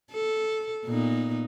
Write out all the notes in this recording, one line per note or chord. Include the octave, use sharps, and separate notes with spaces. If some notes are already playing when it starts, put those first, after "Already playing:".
A4
A#2 B3 D#4